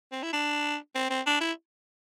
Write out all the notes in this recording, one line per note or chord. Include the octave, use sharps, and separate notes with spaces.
C4
E4
D4
C4
C4
D4
E4